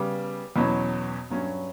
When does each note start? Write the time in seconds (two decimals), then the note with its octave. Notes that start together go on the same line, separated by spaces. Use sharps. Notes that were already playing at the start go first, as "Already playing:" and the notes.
Already playing: C#3 G3 B3 D6
0.56 E2 B2 F#3 C#4 B5
1.30 G2 F#3 C#4